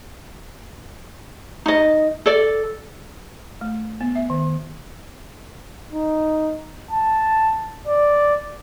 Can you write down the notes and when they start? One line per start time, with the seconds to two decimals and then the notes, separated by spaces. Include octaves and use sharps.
1.66 D#4 D#5
2.26 A4 D5
3.61 A3
4.01 B3
4.15 E5
4.30 D#3
5.93 D#4
6.91 A5
7.87 D5